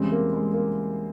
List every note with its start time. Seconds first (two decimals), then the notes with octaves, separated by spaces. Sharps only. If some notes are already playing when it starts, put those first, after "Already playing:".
Already playing: E2 C#3 E3 G3 G#3 C4
0.11 A#3
0.33 G#3
0.53 A#3